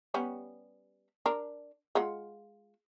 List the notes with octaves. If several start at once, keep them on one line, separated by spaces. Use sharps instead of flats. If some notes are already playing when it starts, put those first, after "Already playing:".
G3 B3 C#4
D4 A#4
G#3 F4 F#5